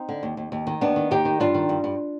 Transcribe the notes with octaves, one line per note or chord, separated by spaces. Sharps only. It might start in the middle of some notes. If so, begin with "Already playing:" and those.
Already playing: C4 D#4
D3
D#2
D#2
D#2
D#3
D#2 B3 D4
D#3
D#2 D#4 G4
D#3
G2 D4 F4
D#3
G2
G2